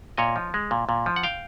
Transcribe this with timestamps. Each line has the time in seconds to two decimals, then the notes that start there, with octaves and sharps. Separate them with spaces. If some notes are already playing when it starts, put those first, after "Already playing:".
0.18 A#2 C#5 D#5
0.36 F3
0.54 G#3
0.71 A#2
0.89 A#2
1.06 F3
1.16 F#5
1.23 F5 G5